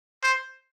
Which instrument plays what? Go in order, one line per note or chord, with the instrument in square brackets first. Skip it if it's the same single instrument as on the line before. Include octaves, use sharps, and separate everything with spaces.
[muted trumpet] C5